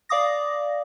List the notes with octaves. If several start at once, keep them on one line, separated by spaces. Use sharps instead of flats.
D5 F5 D6 D#6 A#6